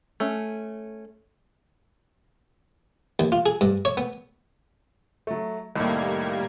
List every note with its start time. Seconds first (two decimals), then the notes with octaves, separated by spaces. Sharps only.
0.20 A3 C#4
3.19 D#2
3.32 F4
3.46 G#4
3.61 G2
3.85 C#5
3.97 B3
5.27 F#3 A3
5.76 C2 A2 D#3 G3 A#3 G#6